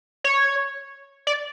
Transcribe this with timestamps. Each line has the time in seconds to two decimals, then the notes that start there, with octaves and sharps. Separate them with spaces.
0.24 C#5
1.27 D5